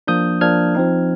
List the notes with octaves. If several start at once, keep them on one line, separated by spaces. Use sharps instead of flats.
F3 A#3 D4 D#6 G6
F3 A#3 D4 F6 G#6
F3 C4 D#4